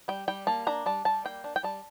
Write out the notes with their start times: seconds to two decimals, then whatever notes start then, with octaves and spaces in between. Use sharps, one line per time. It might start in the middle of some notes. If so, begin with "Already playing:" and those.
0.08 G3 G5
0.28 G3 G5
0.47 A#3 A5
0.67 D4 A#5
0.86 G3 A5
1.05 G3 A5
1.25 A#3 G5
1.44 D4
1.56 G5
1.63 G3 A5